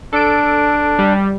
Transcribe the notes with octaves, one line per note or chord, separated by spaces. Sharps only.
D4 A4 D7
G3